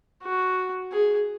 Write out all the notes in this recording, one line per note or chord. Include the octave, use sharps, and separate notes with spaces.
F#4
G#4